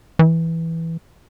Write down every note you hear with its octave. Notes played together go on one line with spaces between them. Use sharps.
E3